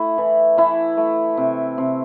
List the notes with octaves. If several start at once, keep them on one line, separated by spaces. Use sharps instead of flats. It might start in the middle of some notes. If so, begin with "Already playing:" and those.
Already playing: A3 E4
E3
E3 E4
A3
C3
C3